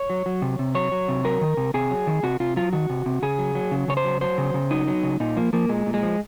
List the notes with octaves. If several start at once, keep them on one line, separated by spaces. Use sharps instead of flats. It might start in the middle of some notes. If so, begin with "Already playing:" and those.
Already playing: C#5
F#3
F#3
C3
C3
F#3 C#5
F#3
C3
F#3 A#4
D#3
C3
C3 G#4
F#3
D#3
C3 F#4
C3 F4
F#3 F4
D#3 F#4
C3
C3
C#3 G#4
F#3
F#3
C#3
C#3 C#5
C5
F#3
F#3 C5
C#3
C#3
F#3 D#4
F#3
C#3
A#2 D#4
F3 A#3
F3 A#3
A#2 G#3
A#2
G#3
F3